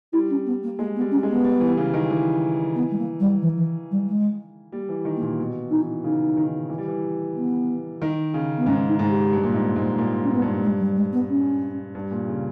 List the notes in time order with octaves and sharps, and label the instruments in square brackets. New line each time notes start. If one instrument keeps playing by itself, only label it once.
[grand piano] G3 [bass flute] E4
[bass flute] C#4
B3
A#3
[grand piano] G#3 [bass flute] A#3
[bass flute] B3
[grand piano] G3
[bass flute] C#4
[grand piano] G#3
[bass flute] B3
[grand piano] G3
E3
C#3
D#3
E3
[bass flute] B3
G#3
A#3
G3
E3
E3
G3
G#3
[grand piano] G3 [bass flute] A#3
[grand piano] E3
D#3
[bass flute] A#3
[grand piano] A#2
B2
[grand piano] E3 [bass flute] D#4
[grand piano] C#3 [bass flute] D#4
[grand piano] D#3
E3
G3
E3
[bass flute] B3
[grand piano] D#3
C#3
[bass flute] B3
[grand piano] G#2 [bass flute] C#4
[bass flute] D#4
[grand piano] G#2
[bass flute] G4
[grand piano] G2
A#2
G#2
G#2
A#2
[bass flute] C#4
B3
[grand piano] G2
[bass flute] G#3
G3
G#3
B3
C#4
[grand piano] G2
A#2
C#3